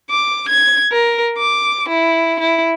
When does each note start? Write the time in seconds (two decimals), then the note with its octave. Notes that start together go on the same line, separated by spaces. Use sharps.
0.10 D6
0.49 G#6
0.92 A#4
1.38 D6
1.89 E4
2.40 E4